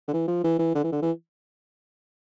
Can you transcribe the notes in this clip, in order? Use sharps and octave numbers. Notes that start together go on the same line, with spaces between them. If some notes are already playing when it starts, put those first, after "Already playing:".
D3
E3
F3
E3
E3
D3
E3
D3
E3